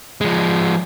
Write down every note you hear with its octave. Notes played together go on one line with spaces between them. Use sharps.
F3 G#3